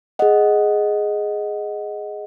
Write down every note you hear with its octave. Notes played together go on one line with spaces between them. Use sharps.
G#4 D#5 F#5